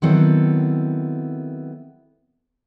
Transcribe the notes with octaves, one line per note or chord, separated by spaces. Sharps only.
D#3 F#3 B3 C4 E4 A4